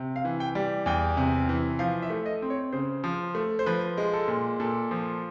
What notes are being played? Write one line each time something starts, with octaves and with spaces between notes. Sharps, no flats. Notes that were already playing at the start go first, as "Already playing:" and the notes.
Already playing: C3
F5
E3
G5
G3
E2 G5
C3
E3
F3 F5
E5
A3
D#5
C4
C#5
C#3 C5
F3
A3
C5
F3 B4
G#3
A4
A#2
A#2 A4
F3